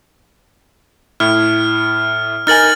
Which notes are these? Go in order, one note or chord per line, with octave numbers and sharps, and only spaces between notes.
A2 E4 F6
D#4 A#4 G#5 F6 A6 F#7